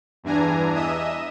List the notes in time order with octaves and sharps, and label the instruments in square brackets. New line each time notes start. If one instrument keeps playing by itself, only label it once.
[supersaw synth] E2 G2 E3 D4 G#5 A#5
D#5 E5 D#6 E6